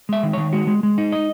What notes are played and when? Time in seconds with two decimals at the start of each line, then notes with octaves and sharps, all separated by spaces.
0.09 G#3 E5
0.23 D#3
0.33 D#3 C#5
0.53 G#3 F#4
0.67 G#3
0.83 G#3
0.98 D#4
1.12 D#5